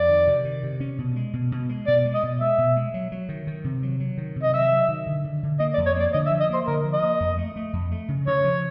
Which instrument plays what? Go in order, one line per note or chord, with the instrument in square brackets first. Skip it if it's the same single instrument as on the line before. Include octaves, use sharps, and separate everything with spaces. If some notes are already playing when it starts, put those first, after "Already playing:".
Already playing: [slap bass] F2 [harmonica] D5
[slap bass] D#3
C3
D#3
C3
C#4
B2
G#3
B2
B2
G#3
[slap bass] B2 [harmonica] D5
[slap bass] G#3
[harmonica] D#5
[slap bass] B2
[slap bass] G#3 [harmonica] E5
[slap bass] B2
G#3
F#3
F#3
D#3
D#3
C3
F#3
F#3
D#3
C3
[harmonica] D#5
[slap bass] F#3 [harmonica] E5
[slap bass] F#3
D#3
D3
D3
D3
[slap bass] A#3 [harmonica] D#5
[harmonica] D5
[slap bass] F2
[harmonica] C#5
[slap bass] A#3 [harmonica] D5
[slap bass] D3 [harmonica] D#5
[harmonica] E5
[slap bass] F3
[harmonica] D#5
[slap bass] A#3 [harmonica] C5
[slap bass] D3 [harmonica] A#4
[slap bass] F3
[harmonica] D#5
[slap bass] A#3
F2
A3
A3
F2
A3
C#3
[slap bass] C#3 [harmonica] C#5
[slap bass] F3